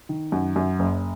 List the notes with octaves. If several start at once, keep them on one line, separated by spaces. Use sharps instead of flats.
D#3
F#2
F#2
F#1